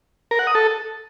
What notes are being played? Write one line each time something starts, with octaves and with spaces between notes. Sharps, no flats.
A#4
F#5
D#6
A4